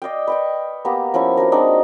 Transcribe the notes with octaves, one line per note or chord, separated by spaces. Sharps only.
D5 D#5 F5 G5
B4 G5 C#6
A#3 B3 G4 A#5
F3 C#4 E4 C#6
D4 F#4 A#4
G#3 C4 D4 D#4